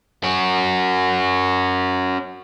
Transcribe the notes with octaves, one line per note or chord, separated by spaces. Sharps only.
C#4 F#4